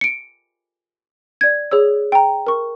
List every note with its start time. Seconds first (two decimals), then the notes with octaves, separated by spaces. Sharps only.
0.01 C#7 D7
1.41 D5 G#6
1.71 G#4 C#5 E6
2.12 G5 A#5
2.47 A#4 C#6